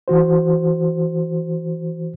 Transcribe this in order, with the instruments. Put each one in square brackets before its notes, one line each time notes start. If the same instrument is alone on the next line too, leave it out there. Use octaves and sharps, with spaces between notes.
[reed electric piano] E3 F#4 C5